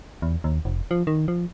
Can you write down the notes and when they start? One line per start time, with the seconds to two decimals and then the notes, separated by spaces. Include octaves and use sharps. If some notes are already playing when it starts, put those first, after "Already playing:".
0.22 E2
0.44 D#2
0.65 F1
0.91 F3
1.07 D#3
1.28 F3